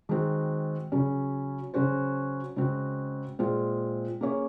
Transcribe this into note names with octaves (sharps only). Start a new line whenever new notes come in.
D#3 G#3 C4 F#4
C#3 F#3 C#4
C#3 F#3 C#4 F#4 C5
C#3 G#3 C4 F#4
A#2 G#3 C4 F4 G#4
A#3 C#4 G#4 C#5